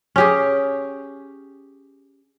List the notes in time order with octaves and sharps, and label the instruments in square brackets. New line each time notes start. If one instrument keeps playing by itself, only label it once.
[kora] C#4 G4 G#4